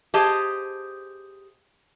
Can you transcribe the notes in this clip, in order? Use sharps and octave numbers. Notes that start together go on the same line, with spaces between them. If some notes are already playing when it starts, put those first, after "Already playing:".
G4 G#4 C5 D#5 A5